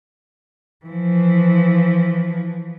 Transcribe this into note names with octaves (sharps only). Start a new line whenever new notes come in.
E3 F3